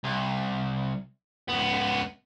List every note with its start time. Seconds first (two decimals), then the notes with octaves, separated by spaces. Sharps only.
0.04 C2
1.49 C#2 B3